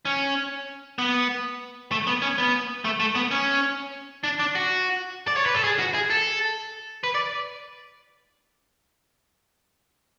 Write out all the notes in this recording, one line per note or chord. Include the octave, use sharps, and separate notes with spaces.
C#4
B3
A3
B3
C#4
B3
A3
A3
B3
C#4
D4
D4
F#4
D5
C#5
B4
A4
G#4
F#4
G#4
A4
B4
D5